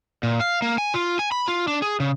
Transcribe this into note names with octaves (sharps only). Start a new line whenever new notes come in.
A#2
F5
A#3
G#5
F4
G#5
B5
F4
D4
G#4
C#3